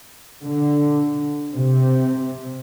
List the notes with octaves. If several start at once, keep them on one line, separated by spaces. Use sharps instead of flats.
D3
C3